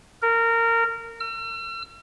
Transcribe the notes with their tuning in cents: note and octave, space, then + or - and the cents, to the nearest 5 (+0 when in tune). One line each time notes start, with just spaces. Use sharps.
A#4 -20
E6 +45